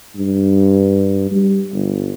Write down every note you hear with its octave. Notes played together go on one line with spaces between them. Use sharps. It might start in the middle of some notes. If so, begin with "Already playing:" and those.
G2
G3
G1